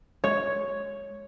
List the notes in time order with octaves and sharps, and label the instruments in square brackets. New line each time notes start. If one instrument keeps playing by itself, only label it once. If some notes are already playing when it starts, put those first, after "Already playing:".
[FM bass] G#3 [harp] C#5